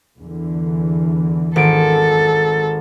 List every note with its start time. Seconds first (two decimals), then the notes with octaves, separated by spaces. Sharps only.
0.19 E2 D3 E3
1.56 G#1 A4 D7